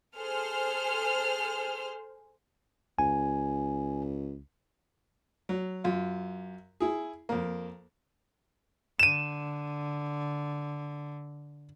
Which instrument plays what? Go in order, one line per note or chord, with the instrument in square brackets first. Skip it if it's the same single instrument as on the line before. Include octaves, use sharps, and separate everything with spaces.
[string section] G#4 A4 C5 F6
[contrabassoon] C#2 [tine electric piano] G#5
[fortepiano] F#3
F#2 F4
E4 G#4
F2 A#3
[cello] D3 [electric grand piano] D#7 E7